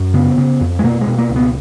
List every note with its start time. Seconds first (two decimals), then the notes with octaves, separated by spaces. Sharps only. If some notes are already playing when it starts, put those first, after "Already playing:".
Already playing: F#2
0.14 C#3 B3
0.38 C#3
0.61 F2
0.79 G#3
0.83 B2 A#3
1.01 G#3
1.07 B2
1.18 A#3
1.29 C#2
1.36 B3